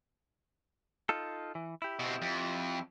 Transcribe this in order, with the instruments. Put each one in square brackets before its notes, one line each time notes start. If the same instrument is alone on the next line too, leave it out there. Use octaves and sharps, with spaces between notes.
[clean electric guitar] D#4 F4 A4
E3
E4 G4
[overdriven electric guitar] B2 C4
F2